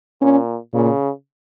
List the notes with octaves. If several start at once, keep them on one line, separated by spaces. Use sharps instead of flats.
A#2 C#4
A#2 C#3